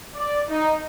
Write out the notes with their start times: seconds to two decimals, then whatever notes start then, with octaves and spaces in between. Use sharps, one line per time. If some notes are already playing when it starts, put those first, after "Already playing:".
0.15 D5
0.48 D#4